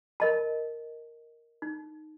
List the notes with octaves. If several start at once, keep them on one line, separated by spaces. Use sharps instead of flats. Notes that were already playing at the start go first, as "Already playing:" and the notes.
A#4 D#5 A5
D#4